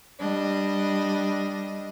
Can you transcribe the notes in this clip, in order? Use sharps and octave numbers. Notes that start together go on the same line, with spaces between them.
G3 D4 D#5